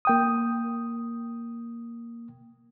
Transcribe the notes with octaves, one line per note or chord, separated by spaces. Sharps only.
A#3 G5 D#6